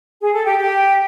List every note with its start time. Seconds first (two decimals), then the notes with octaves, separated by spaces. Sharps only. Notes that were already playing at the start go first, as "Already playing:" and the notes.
0.22 G#4
0.34 A4
0.45 G4
0.57 G4